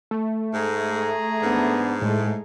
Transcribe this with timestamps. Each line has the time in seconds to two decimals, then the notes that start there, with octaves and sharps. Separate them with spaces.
0.11 A3
0.54 G#2 G#4 A#5
1.42 G#2 B3 D4
2.02 A2 G#3 A3